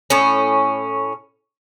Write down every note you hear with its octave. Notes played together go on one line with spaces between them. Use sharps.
A2 C#4